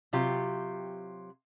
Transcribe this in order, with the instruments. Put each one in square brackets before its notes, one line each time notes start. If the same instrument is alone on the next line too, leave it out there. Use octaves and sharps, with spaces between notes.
[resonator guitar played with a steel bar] C3 F#3 F4 G4